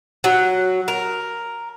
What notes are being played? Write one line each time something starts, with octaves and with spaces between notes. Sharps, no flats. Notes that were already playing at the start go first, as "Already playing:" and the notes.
F#3
A#4